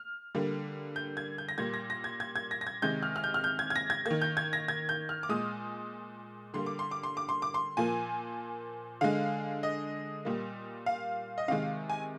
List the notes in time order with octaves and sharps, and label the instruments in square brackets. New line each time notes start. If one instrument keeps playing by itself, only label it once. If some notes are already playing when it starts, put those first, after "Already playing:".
Already playing: [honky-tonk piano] F6
D3 G3 A#3
G6
G#6
G6
A#6
A#2 G3 A#3 G#6
A#6
A#6
G#6
G#6
G#6
A#6
A#6
G#6
C3 D#3 G#3 G6
F6
F6
G6
F6
G6
G#6
G#6
A#6
G#6
D#3 A#3 G#6
G6
G#6
A#6
G#6
G6
F6
D6
A#2 G#3 D#6
D3 G3 A#3 C6
D6
C6
D6
C6
D6
C6
D6
C6
A#2 F3 A#3 G#5
D3 G#3 F5
D#5
A#2 G3 A#3
F5
D#5
C3 D#3 G#3 F5
G#5